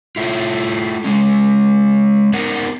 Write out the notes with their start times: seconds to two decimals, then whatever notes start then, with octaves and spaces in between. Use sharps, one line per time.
0.16 A3 E4 F4
1.04 G#3 C#4
2.33 B3 D#4 A#4 F#5